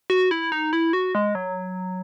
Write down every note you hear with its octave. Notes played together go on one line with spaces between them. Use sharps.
F#4
E4
D#4
E4
F#4
G#3
F#3